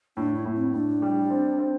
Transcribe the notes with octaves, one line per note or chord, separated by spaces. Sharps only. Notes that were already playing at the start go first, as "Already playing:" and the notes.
A2 D4
E4
A2
C4
A2 D4
G3
C4
C4